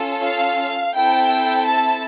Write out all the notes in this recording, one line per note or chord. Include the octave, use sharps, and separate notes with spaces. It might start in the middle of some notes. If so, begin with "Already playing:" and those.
Already playing: C#4 F4 A4
F5
C4 E4 A4 G5
A5